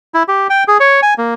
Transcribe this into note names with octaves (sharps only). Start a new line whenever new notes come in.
E4
G4
G5
G#4
C#5
G#5
A#3